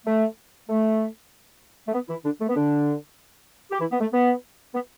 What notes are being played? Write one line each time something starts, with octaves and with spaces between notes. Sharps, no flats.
A3
A3
A3
B3
E3 E4
D3 D4
A3
B3
D3 D4
G4
E3 E4
B3
A3
B3
B3